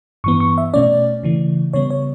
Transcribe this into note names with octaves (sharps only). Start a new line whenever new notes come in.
G2 E3 B3 C#6
C#6
E5
B2 A3 C#4 D5
C#3 E3 A3
C#3 G3 B3 C#5
C#5